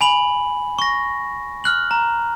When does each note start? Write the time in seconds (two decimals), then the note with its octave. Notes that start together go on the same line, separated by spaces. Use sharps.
0.01 G#5 B5 F#7
0.79 C#6 A#6
1.64 F6 F#6 F#7
1.91 A#5